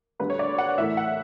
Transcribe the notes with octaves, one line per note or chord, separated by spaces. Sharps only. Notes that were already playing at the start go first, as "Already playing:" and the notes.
D2 D3 G3 B4
C#5
D5
F#5
A2 E3 A3 E5
F#5